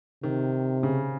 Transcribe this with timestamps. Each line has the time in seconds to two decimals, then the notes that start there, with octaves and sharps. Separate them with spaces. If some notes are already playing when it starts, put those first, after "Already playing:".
0.23 C3 D#3
0.83 C#3